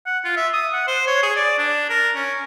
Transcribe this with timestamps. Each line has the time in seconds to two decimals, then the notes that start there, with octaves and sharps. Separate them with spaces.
0.06 F#5
0.24 F4
0.36 E5
0.53 D#6
0.73 F#5
0.88 C5
1.07 C#5
1.23 G#4
1.36 D5
1.58 D4
1.90 A#4
2.15 C#4